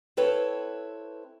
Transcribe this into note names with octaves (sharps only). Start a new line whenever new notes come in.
C4 E4 A4 B4 C#5